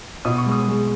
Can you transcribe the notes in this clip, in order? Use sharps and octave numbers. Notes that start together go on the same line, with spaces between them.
B2 D#6
C#6
G#3
D#6
G#3